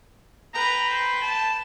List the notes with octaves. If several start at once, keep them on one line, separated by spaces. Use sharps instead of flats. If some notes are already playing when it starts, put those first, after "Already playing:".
B4 G5 A#5
C5
A5